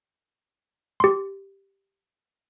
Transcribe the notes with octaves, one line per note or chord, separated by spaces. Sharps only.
G4 C6